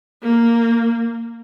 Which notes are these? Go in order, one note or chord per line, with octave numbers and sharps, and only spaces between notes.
A#3